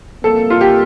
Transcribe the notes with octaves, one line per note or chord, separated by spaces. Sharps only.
F2 C3 G3 A#3 A4
F4
G4